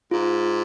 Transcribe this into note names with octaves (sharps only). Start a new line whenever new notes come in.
G#2 F4